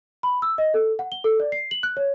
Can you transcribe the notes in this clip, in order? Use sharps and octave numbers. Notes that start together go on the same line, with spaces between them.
B5
E6
D#5
A4
F#5
G7
A4
D5
C7
F#7
F#6
C#5